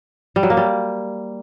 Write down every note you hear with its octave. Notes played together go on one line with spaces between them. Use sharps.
G3
F#3
A#3
G3